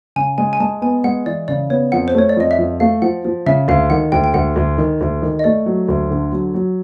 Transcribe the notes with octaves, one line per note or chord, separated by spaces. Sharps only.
C#3 G#5
G#3 G#5
G#5
G#3 A5
B3 G#5
G#3 F#5
E3 D5
C#3 D5
B3 C#5
F2 F#5
C5
A3 C#5
D5
F2 D#5
E5
F2
A3 F5
F3 F#5
F3
C#3 E5
D2 F5
D#3 F#5
D2 G5
G5
D2 F#5
D2
D#3
D2
D#3
D#5
A3 D5
F#3
D2
D3
F#3
F#3